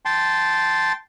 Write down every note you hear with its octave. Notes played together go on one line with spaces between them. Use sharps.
G5 A5 C6